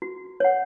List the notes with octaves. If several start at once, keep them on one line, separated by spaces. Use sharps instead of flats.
F#4
C#5 F#5